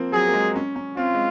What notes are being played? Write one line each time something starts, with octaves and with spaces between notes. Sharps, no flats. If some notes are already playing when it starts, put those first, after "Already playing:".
Already playing: F3 A#3 C4
F#3 G#4
A#3
G#3
C#4
C#4
C4 F4
G#3